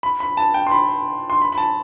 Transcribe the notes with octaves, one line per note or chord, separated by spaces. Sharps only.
B5
B5
A5
G5
C6
B5
C6
B5
B5
A5